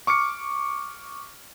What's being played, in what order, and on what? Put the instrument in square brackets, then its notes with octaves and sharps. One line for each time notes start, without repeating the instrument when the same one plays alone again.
[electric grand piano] C#6 D6 F6 C#7